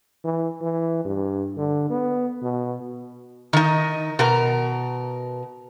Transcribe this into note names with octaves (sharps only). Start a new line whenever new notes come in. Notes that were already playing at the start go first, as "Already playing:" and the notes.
E3
E3
G2
D3
B3
B2
D#3 D#4
B2 A#4 A#5